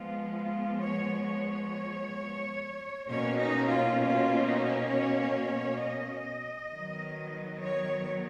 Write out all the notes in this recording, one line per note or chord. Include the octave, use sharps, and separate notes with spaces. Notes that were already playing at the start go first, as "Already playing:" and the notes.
Already playing: F3 G#3 B3 F4
F4
C#5
C#5
B2 A#3 C#4 C#5
D#4
F4
F4
D#4
C#5
D#5
D#3 F#3 B3
C#5